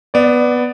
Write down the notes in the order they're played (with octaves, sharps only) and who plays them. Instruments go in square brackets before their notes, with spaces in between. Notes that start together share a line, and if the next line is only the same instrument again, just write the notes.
[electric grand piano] B3 [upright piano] D5